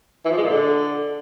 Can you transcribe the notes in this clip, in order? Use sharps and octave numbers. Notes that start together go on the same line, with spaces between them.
E3
F3
G#3
A#2
D3